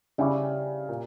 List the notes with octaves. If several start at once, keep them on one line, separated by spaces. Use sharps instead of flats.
C#3 G3 C#4 E4 G4
A#2